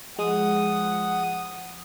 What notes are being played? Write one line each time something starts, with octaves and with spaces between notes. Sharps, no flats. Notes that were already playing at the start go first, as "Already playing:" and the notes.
F3 G#3 F#5 D#6